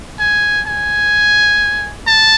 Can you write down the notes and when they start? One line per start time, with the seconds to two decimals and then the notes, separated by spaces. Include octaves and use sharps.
0.20 G#5
0.67 G#5
2.07 A5